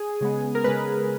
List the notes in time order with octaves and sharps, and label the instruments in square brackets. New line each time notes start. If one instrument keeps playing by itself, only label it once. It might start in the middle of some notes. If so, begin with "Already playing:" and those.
Already playing: [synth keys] G#4
C#3 G#3 B3
A#4
C#3 G#3 B3 B4